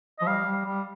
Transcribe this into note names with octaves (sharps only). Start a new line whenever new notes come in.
F3 D#5
G3 F5
G3
G3